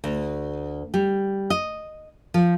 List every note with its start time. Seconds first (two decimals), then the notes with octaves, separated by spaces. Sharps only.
0.04 D2
0.94 G3
1.50 D#5
2.34 F3